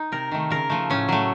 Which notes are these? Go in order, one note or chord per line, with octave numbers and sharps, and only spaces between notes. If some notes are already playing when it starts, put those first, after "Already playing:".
Already playing: D#4
C3 A#4
D#3 A3
C#3 A#4
F3 A3
A2 C#4
F#3 A3